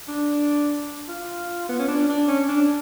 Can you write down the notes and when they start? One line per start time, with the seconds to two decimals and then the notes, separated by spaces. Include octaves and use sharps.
0.08 D4
1.08 F4
1.69 B3
1.79 C#4
1.88 D4
2.09 D4
2.28 C#4
2.48 D4